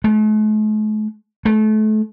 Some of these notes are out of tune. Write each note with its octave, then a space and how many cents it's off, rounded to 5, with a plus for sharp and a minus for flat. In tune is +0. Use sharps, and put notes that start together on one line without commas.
A3 -45
A3 -30